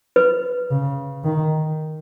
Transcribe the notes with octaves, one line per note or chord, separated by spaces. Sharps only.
B4
C#3
D#3